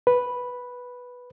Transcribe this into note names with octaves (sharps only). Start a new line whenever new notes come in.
B4